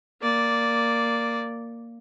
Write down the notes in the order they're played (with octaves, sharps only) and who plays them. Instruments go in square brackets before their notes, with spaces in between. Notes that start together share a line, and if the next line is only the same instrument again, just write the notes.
[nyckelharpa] A#3 D5